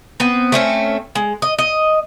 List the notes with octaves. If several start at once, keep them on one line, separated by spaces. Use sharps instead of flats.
B3 C4
A3 C4 C#4
G#3
D#5
D#5